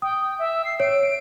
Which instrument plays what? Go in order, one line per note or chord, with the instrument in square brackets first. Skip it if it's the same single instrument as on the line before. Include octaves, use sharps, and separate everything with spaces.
[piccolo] G5 [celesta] D#6
[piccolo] E5
C7
[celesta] C#5 [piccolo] D7